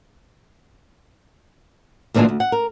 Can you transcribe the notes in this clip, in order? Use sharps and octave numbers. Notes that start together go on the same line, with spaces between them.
D2 A#2 E3 G#3 D4 G#4
D2
F#5
A#4